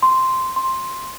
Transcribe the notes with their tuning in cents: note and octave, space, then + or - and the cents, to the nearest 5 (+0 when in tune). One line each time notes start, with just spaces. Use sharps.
C6 -5
C6 +5